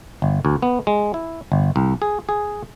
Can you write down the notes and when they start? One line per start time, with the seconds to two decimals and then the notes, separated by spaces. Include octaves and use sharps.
0.22 G1
0.45 D2
0.62 B3
0.87 G#3
1.14 E4
1.52 G1
1.76 C2
2.02 G#4
2.29 G#4